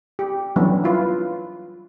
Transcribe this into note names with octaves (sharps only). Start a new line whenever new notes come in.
G4
E3 F#3 G3 B3 C#4 D4
E4 F4 B4